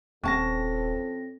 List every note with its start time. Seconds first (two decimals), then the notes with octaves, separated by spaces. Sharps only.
0.24 D#1 F2 C4 C#4 A4 C5 A5 A#6